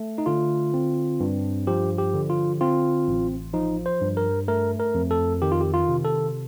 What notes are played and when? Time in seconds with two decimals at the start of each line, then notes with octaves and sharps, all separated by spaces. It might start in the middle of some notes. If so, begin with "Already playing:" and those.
Already playing: A3
0.18 D#4
0.26 D3 F4
0.74 C4
1.20 G2
1.67 F3 G4
1.98 G4
2.14 D3
2.29 F4
2.61 C4 F4
3.08 A1
3.54 F3 D#4
3.86 C5
4.01 G2
4.17 A#4
4.48 A3 A#4
4.79 A#4
4.95 F2
5.11 A4
5.42 D#3 G4
5.52 F4
5.61 G4
5.74 F4
5.89 C3
6.05 A4